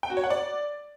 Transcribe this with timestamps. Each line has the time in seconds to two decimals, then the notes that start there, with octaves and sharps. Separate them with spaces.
0.03 G5
0.10 F#4
0.17 C#5
0.24 F#5
0.30 D5